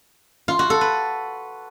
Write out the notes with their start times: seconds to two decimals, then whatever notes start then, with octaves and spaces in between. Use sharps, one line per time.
0.48 F4
0.59 F#4
0.70 A4
0.81 B4